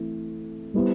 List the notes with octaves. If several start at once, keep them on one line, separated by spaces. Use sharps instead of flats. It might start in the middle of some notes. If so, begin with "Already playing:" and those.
Already playing: E3 A3 C4
G3 B3 E4 G4 C5